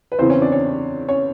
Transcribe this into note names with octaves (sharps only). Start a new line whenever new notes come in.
B4
E2 C#3 E3 C4 C5
C#4 C#5
D4 D5
C#4 C#5
C#4 C#5